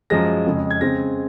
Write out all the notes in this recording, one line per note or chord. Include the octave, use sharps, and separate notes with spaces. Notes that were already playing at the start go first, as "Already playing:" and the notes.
F#2 F3 G#3 A#6
F2 C#3 G#3
G#6
C#3 G#3 C4 A#6